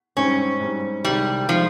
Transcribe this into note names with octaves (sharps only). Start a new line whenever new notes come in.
G#2 G3 C4 C#4
G#2 G3 C4
C2 C3 D#3 G3 G#3
C3 D#3 F3 G#3